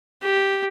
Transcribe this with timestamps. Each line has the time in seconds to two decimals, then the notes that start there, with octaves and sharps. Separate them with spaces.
0.22 G4